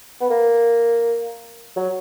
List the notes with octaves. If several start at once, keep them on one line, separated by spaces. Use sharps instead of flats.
B3
A#3
F#3